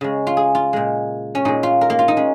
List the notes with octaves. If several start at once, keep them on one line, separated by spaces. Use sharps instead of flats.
C#3 G#3
F4
G#4
F4
A#2 G#3
C#4
A#2 G#3 D#4
F4
A#4
A#3
F4
D#4
G#3 C#4